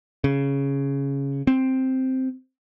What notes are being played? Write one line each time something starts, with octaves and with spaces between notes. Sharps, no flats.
C#3
C4